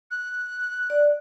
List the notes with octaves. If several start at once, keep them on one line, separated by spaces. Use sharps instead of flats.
F#6
D5